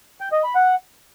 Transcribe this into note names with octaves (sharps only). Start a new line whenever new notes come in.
G5
D#5
B5
F#5